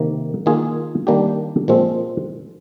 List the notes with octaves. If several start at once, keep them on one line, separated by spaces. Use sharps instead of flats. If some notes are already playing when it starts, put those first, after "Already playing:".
Already playing: C3 D#3 A#3
D#3 A#3 F4 G#4
D#3 G3 A#3 D4 G4
A#2 F3 G#3 C4